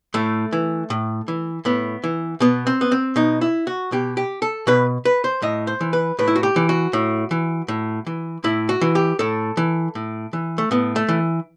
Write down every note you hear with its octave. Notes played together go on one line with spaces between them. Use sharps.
A2 A3
E3
A2
E3
A2 B3
E3
B2 B3
C4
B3
C4
B2 D#4
E4
F#4
B2 G4
G4
A4
B2 B4
B4
C5
A2 D#5
C5
E3
B4
A2 B4
E4
F#4
G4
E3
F#4
A2
E3
A2
E3
A2 E4
F#4
E3
G4
A2 A4
E3
A2
E3
A3
A2 B3
A3
E3